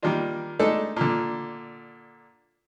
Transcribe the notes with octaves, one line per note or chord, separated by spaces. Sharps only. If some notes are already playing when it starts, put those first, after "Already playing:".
D#3 G3 A#3 D4 F4
G#3 A3 D4 D#4 A4
A#2 D3